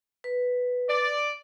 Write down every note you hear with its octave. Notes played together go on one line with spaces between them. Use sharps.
B4
D5